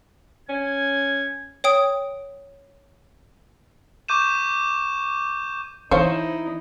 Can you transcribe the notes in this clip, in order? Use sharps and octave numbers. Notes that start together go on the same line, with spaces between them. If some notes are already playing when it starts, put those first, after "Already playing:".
C#4 G#6
C#5 G5 D#6
C#6 D6 G6 D#7 E7
E3 D#4 E4 C5 C#5 F5 A5